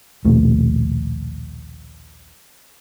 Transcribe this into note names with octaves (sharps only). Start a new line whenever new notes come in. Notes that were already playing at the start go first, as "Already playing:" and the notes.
A#1 D#2 B2 A3